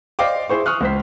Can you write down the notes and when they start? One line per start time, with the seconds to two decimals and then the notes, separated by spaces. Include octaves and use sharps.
0.19 C5 D5 D#5 F5 G5 D6
0.49 E4 G#4 C5 C#6
0.66 C#6 D#6 F6 F#6
0.81 C#2 C5 B6